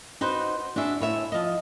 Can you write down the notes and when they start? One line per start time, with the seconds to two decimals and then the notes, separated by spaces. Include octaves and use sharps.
0.21 D#4 F#4 B4 C5
0.76 D4 F#4 G#4 E5
1.00 A2 C#5 E5
1.32 F3 D#5